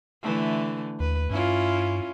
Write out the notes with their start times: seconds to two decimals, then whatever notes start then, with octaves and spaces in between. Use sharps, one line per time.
0.23 D3 E3 A3
1.00 D#2 B4
1.30 G2 C#4 E4 F4